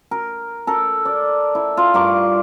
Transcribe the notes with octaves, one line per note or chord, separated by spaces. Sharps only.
A#4
A4 A#4
D5
E4
F4
G2 A#4 C#6 D6